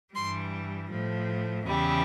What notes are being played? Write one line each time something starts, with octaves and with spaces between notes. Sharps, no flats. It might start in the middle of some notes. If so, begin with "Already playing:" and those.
G2 E3 G3 C6
A2 F3
E2 C#3 E3 G3